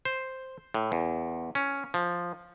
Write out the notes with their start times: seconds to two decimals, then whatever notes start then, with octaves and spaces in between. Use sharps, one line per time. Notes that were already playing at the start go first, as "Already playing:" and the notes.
0.05 C5
0.74 A2
0.92 E2
1.55 C#4
1.94 F3